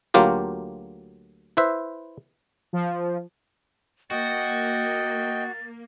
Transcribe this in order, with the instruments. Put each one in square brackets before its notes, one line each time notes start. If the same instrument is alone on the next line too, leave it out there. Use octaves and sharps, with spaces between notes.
[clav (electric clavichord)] D2 F#3 A#3 F4 G4
E4 B4 C5 E5
[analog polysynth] F3
[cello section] A#3 [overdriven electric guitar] F#4 [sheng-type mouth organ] D#5 G5 [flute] A6